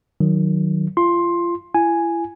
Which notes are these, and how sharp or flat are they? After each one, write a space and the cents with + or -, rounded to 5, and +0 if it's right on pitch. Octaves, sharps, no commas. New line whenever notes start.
D#3 +0 F#3 +0
F4 -25 C6 +10
E4 +35 G#5 +0